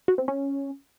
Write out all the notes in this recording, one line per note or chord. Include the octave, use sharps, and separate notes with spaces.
F#4
C4
C#4